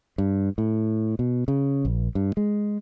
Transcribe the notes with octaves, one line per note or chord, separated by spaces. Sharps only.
G2
A2
B2
C#3
A#1
G2
G#3